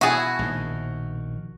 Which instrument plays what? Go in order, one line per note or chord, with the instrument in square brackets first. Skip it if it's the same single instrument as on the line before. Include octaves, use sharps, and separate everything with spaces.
[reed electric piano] B2 [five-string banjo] E4 G#4 [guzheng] F#4 A5
[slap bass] A#1 D#3